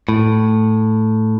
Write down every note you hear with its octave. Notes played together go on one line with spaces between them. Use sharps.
A2